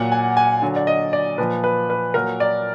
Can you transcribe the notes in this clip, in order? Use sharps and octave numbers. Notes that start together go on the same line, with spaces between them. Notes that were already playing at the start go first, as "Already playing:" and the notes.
Already playing: A#2 F#3 F#5
G#5
G#5
D3 F#3
D5
D#5
D5
A#2 F3 B4
B4
B4
A#2 F#3 A#4
D5